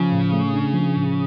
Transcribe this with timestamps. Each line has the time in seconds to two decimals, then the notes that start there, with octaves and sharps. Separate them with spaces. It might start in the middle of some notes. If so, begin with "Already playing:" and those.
Already playing: C#3 F3
0.12 A2
0.33 A3
0.53 D4
0.74 F3
0.96 A2